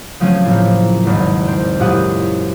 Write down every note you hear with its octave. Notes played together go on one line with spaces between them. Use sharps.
C#3 F3 F#3 A3 C4 C#4
A#1 A2
G#1 E2
C4
F#2 A#2 E4 G4 F#5 D#6